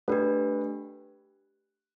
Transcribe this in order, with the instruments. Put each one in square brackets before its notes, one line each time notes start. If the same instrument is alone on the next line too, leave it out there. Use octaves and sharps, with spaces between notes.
[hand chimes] A3 D4 G4 [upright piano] B4